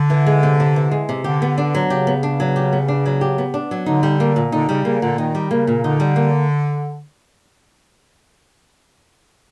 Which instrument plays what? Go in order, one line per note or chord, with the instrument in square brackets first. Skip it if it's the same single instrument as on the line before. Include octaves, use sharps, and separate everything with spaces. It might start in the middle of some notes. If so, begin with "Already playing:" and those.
Already playing: [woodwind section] D3
[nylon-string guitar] E3
G#3
C3
C3
E3
G#3
C3
[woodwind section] D3 [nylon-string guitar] G4
[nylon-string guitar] B3
D4
F#3
[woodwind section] C#3 [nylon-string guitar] G4
[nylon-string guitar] B3
D4
F#3
G4
B3
D4
F#3
G4
B3
D4
F#3
[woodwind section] D3 [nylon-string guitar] D#4
[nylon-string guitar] G3
A#3
A#2
[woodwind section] D3 [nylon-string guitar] D#4
[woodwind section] C#3 [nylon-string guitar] G3
[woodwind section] C#3 [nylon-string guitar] A#3
[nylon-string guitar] A#2 [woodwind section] D3
[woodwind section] D#3 [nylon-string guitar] D#4
[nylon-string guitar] G3
[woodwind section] C#3 [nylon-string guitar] A#3
[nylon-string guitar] A#2
[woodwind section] D3 [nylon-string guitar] D#4
[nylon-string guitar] G3
A#3